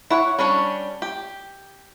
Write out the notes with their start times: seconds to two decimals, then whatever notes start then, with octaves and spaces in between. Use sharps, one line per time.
0.11 E4 C#5 F#5
0.39 G3 C#4 D4 C#5
1.02 G4